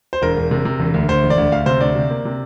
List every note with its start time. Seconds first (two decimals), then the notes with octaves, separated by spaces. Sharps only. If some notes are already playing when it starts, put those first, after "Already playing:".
0.13 C5
0.22 E1 A#4
0.37 E1
0.51 C3
0.65 C3
0.80 E1
0.94 D2
1.09 D2 C5
1.23 E1
1.30 D5
1.38 D2
1.52 D2 F5
1.66 C3 C5
1.81 D2 D5
1.95 C3
2.11 A#3
2.25 C3